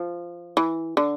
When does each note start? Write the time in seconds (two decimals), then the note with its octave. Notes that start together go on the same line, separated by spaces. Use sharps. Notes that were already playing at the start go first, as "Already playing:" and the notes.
Already playing: F3
0.57 E3
0.97 D3